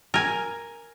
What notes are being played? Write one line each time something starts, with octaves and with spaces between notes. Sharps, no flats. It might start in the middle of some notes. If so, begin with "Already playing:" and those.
A#4 G#5